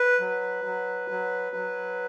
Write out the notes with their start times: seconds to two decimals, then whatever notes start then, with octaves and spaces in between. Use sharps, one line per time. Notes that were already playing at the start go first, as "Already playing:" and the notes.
Already playing: B4
0.20 F#3
0.65 F#3
1.11 F#3
1.56 F#3